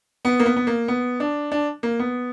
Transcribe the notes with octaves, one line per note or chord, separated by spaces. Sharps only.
B3
A#3
B3
B3
A#3
B3
D4
D4
A#3
B3